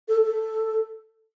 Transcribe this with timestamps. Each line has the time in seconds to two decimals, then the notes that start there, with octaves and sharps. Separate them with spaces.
0.08 A4
0.24 A4